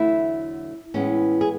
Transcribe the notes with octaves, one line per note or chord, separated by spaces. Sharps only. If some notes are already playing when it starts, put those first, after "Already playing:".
Already playing: E2 D3 F#3 A3 E4
A2 E3 G#3 B3 C#4
G#4